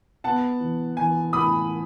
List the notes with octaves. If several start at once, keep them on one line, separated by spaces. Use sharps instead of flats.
B3 F#5 A5
E3
E3 G#5
A2 B5 D#6